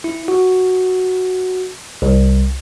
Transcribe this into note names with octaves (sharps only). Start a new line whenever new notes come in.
E4
F#4
C2